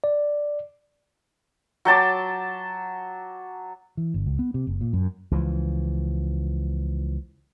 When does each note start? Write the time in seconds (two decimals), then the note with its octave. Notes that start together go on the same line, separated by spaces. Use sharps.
0.04 D5
1.85 F#3 G5 A5 D6
3.97 E3
4.14 G1
4.26 C#2
4.39 B3
4.54 C3
4.67 F#1
4.81 A#2
4.93 F#2
5.31 C#2 E3 F3